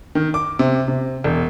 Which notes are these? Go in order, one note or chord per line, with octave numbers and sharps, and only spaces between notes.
D#3
D6
C3
C3
E1